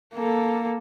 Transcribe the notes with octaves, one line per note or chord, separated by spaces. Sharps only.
A#3 A4